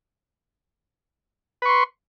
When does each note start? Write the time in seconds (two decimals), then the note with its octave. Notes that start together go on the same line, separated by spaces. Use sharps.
1.62 B4
1.65 C#6
1.69 C6